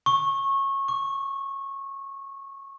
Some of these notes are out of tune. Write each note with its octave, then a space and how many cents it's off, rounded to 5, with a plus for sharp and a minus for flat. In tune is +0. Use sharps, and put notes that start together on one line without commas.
C#6 -20
C#6 +40